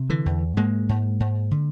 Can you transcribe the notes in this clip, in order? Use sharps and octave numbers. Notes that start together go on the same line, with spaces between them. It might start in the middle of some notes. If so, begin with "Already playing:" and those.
Already playing: C3
D3 E3
E2
G#2 G#3 A#3
G#2
G#2
D3